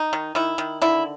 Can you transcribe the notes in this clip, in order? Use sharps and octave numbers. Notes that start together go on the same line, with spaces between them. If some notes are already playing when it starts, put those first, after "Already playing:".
Already playing: D#4
D#3
D#3 E4
D#3
D3 E4